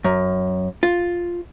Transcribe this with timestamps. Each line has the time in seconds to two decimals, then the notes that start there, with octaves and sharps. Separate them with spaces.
0.04 F#2
0.83 F4